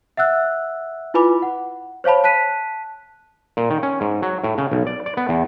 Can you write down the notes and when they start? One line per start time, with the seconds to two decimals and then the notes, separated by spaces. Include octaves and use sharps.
0.17 E5 F#5 E6 F#6
1.14 E4 F4 B4 G#5 B5 D6
1.42 F#5
2.04 C5 C#5 F5 A5 B5
2.24 A5 F#6 B6 D#7
3.57 A#2
3.70 D#3
3.83 C#4
4.01 G#2
4.22 F#3
4.44 A2
4.58 C#3
4.72 B1
4.87 D5
5.06 D5
5.17 B3
5.29 E2